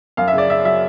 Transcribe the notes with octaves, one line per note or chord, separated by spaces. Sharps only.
F#2 F5
E5
C#3 D5
C#3 E5
F#3 E5